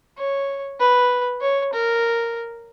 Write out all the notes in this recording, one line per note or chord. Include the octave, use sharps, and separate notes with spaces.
C#5
B4
C#5
A#4